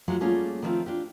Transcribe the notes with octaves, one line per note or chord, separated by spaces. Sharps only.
F3 F#3 G#3 A3 F4
G3 A3 A#3 C#4 F4 G#4
D#3 F3 G3 A3 C4 F4
D4 F4 G4